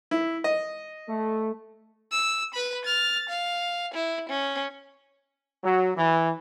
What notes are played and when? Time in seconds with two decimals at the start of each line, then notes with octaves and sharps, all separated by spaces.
0.11 E4
0.44 D#5
1.09 A3
2.12 E6
2.54 B4 B5
2.85 F6 A6
3.29 F5
3.94 E4
4.29 C#4
5.63 F#3
5.95 E3